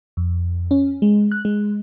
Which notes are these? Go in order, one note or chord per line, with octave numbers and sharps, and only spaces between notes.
F2
C#4
G#3
F#6
G#3